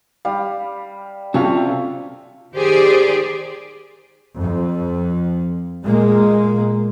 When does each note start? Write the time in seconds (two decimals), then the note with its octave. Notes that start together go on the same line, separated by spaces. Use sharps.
0.25 G3 F5
1.34 C3 C4 C#4 F4 F#4 A4 F5
2.53 D#3 G4 G#4 C5 D5
4.38 F2
5.84 A#2 G#3 A#3